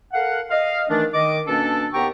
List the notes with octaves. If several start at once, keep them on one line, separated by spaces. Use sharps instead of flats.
A4 A#4 F5 F#5
D#5 F5
D#3 E3 A3 D4
D#3 D#5 D6
B2 A#3 C#4 D4 A4
D#2 B3 G4 G5 A#5 C#6